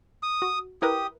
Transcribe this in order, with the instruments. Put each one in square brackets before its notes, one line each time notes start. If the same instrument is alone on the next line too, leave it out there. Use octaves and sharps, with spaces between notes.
[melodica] D#6
[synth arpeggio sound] F#4
[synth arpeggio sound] E4 A#4 B4 [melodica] G4 D#6